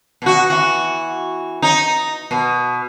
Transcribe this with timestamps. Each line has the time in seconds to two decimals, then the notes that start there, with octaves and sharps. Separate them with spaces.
0.22 B2 F#4
0.50 E3 F#4
1.62 D#4
2.31 B2